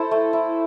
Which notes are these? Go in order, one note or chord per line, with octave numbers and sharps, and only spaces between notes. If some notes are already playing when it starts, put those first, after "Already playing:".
Already playing: E4 A4 C5
A3
E4